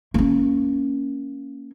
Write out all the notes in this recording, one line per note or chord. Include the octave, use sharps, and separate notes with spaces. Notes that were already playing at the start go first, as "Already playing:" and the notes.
A#3 C#4